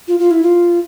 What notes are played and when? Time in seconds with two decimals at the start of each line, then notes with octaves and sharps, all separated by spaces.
0.08 F4
0.19 F4
0.31 E4
0.43 F4